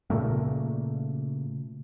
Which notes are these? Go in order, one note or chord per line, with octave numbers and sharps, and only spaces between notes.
A#2 C#3 A3 A#3